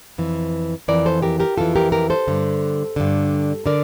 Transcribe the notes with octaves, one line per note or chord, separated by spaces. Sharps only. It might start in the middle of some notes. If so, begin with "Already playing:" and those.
F2 E3
F2 E3 A#4 D5
A4 C5
G4 A#4
G4 A#4
F2 E3 F4 A4
G4 A#4
G4 A#4
A4 C5
G2 D3
G2 D3
D3 A#4 D5